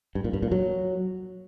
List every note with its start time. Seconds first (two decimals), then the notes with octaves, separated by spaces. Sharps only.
0.15 G2
0.24 A#2
0.33 G2
0.42 A#2
0.51 F#3